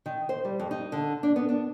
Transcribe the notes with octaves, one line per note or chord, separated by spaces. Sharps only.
D#3
C5
G3
F2
D#4
D3
D4
B3
D4